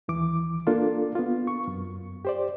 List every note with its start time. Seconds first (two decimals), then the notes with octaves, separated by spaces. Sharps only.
0.08 D#2 E3 D6
0.67 A#3 D4 F4 A4
1.15 B3 F4
1.47 C#6
1.67 F#2
2.25 G4 C5 D5